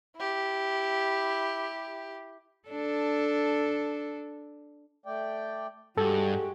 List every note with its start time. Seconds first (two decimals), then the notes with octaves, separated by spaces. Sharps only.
0.17 E4 G4
2.69 D4 A4
5.06 A3 D5 G5
5.98 G2 G#3 F#4 G4 A4